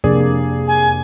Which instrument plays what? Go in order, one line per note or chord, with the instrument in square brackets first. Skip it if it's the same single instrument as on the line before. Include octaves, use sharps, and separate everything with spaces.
[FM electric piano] F2 D4 [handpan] C3 A#3 D5 [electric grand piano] G#4
[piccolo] G#5